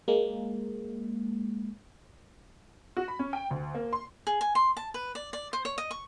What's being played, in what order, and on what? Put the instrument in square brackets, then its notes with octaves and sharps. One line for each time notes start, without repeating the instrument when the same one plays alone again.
[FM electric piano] G#3 A#3
[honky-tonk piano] F#4
B5
C#4
G5
D2
A#3
C6
[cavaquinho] G#4
G#5
C6
A5
B4
D5
D5
C5
C#5
D#5
C#6